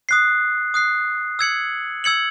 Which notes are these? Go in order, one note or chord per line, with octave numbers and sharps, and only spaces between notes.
D#6 F#6 C7
D#6 F#6 C7
E6 G#6 C#7 F#7
E6 G#6 C#7 F#7